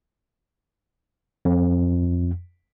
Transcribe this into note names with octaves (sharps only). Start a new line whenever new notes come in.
F2